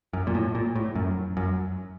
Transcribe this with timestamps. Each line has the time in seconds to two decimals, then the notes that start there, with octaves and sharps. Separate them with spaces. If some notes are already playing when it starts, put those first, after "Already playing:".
0.13 F#2
0.27 A#2
0.34 A2
0.55 A#2
0.76 A2
0.95 F#2
1.37 F#2